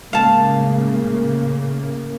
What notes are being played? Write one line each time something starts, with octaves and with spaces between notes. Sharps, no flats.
A2 C#3 G#3 A#3 F5 A5